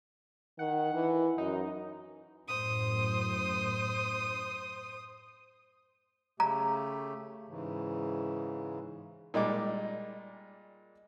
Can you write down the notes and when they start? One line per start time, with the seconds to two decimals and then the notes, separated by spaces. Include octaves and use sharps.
0.59 D#3 F#5
0.94 E3
1.38 F#2 D#4
2.48 F#2 A2 C5 D#6
6.40 C#3 A3 G4 A#5
7.48 G#2 C#3 E3
9.34 A#2 G3 G#3 D#4 D6